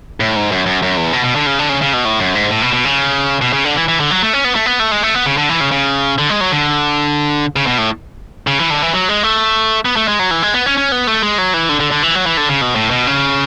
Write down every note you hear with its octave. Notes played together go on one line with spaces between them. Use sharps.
A2
G#2
F#2
F#2
F#2
E2
B2
B2
D3
C#3
D3
C#3
C#3
B2
A2
F#2
G#2
A2
B2
B2
C#3
B2
C#3
D3
E3
E3
D3
F#3
A3
C#4
B3
A3
B3
A3
G#3
A3
B3
C#3
D3
E3
C#3
C#3
D3
G#3
F#3
D3
C#3
B2
A2
C#3
E3
D3
E3
F#3
G#3
A3
B3
A3
G#3
F#3
E3
G#3
B3
C#4
C#4
B3
A3
G#3
F#3
E3
D3
D3
D3
E3
F#3
E3
D3
C#3
B2
A2
B2
C#3